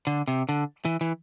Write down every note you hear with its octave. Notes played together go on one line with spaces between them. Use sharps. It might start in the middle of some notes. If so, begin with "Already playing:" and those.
D3
C3
D3
E3
E3